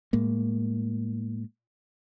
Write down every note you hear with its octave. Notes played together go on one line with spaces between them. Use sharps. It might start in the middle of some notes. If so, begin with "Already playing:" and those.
A2 G#3 A#3